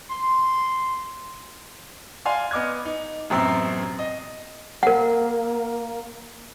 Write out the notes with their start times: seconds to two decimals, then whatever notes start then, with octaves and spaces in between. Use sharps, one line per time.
0.10 C6
2.25 D5 F5 G#5 C6
2.51 B3 D#5 D6 F6 G#6
2.85 D#4
3.30 A1 F#2 B2 C4 E6 C7
3.99 D#5
4.83 A#3 A#4 F#5